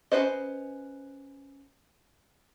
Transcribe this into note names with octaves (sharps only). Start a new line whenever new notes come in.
C#4 A4 B4 C5 D#5